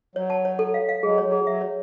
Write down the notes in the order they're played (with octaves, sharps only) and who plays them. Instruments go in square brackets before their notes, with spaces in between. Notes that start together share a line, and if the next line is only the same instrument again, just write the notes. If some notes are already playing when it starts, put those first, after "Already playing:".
[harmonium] F#3 [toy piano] C#5
[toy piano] A5
C#5
A4
F5
F5
[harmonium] F#3 G#3 [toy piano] G#4
[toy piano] C#5
[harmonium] F#3
[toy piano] G#4
[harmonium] F#3 [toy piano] E5
[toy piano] C#5